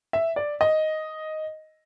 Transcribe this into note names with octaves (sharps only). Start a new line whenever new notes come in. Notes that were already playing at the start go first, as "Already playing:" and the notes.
E5
D5
D#5